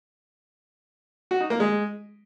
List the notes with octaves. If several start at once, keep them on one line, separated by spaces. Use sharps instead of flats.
F#4
D#4
A#3
G#3